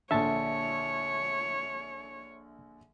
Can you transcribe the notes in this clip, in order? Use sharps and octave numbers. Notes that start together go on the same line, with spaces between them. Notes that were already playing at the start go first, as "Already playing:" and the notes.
A#1 D3 C#5 E5 A5